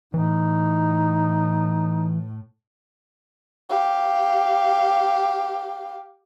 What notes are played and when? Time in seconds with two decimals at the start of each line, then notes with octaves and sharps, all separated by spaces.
0.14 A2 E3 D#4
3.70 G4 F5